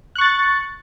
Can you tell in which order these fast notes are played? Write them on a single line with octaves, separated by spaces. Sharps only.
F#6 C#6 A6